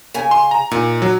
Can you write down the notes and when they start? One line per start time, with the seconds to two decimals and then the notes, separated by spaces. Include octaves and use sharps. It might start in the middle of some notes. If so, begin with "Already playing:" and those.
0.14 C#3 G#5
0.31 C6
0.51 A#5
0.71 A#2 D#4
1.02 F#3